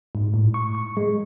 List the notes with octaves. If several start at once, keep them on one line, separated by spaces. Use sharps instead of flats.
G#2
A2
C#6
C#6
G#3